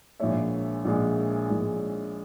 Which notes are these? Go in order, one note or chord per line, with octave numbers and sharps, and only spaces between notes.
A#1 A#2 G#3 C#5 E5
A#1 A#2 G#3
A#1 A#2 G#3